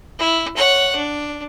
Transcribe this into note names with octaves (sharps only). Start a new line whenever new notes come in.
E4
C#5 F#5
D4